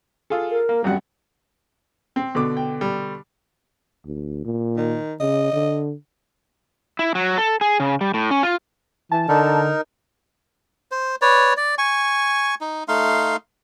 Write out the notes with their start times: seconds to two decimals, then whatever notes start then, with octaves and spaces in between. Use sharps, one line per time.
0.30 F4 G#4 A4
0.51 A#4
0.69 A#3
0.84 G#1 F#2 G3 F#5
2.16 C4
2.35 B2 D3 D6
2.57 G5
2.81 G3
4.05 D2
4.45 A#2
4.76 D#3
5.20 C#3 D#5
5.53 D3
6.99 E4
7.15 F#3
7.38 A4
7.61 G#4
7.80 C#3
8.01 G3
8.14 A2
8.31 C#4
8.43 F4
9.12 E3 A5
9.29 D3 D#4 A#4
10.91 C5
11.22 B4 C#5 D5
11.57 D5
11.78 G#5 C#6
12.61 D#4
12.88 A3 D#4 F5 C6